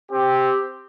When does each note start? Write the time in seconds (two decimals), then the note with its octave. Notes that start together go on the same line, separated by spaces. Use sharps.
0.12 C4 G4